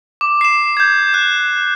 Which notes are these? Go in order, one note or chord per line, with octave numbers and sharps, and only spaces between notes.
D6
C7 E7
G6 G#6
F#6